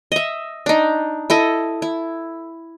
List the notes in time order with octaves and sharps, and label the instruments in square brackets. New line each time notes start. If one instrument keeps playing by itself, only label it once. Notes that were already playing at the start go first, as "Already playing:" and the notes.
[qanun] D#5 E5
D4 D#4
E4 A4 D#5
E4